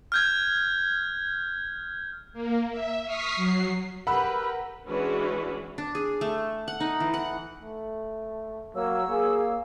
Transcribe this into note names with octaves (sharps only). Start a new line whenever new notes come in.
F6 G6 G#6
A#3
E5
C#6 D#6 F6 B6 C7
F#3 C7
G4 A#4 B4 F#5 B5 E6
E3 G#3 C#4 D4 F#4 B4
D4
G#4
A3
F#5
D#4
E3
F#5
A3
F#3 A#3 C#5 E6
A#3 G#4